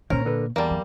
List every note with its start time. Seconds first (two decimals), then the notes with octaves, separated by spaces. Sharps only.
0.10 A#2 A#3 C#4 A#4 C5 C#5
0.25 D3 A4 B4
0.56 E2 G3 A#3 A5
0.70 F#3